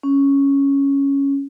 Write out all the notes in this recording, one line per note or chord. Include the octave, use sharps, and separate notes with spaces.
C#4